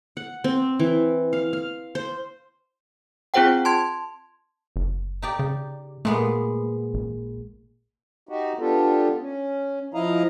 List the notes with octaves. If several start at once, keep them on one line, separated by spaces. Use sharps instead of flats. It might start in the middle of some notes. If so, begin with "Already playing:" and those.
F#5
C4
E3
F5
F5
C5
C4 F4 G#4 C5 F#5 G5
A5 C6 G#6
F#1
D#4 G4 D5
C#3
A#2 G#3 A3 B3
A1
D#4 F#4 G4
B3 D4 F4 G4 A4
C#4
F3 E4 D#5 F5 A#5